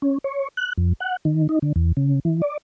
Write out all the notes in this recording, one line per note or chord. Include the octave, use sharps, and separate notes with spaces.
C#4
C#5
F#6
F2
F#5
D#3
D#4
D3
E2
C#3
E3
D5